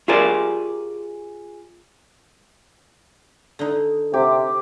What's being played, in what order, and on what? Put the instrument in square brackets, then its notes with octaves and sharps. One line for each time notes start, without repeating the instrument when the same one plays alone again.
[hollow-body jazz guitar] F4 G4 G#4 A#4 C5 D5
[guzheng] D3 D#4
[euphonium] C3 [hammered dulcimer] G4